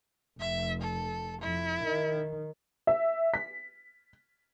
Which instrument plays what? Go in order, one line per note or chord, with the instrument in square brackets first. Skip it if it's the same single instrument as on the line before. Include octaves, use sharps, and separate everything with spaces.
[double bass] F1 [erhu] E5
[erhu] A4
[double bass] F2 [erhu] E4
[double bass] D#3
[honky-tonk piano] E5
B6